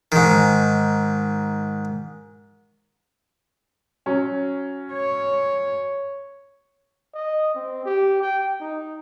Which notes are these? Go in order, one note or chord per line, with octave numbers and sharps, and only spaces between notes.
G#2 D#3
F#3 C#4
C#5
D#5
C4
G4
G5
D#4